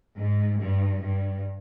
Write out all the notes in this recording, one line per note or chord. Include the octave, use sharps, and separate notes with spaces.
G#2
G2
G2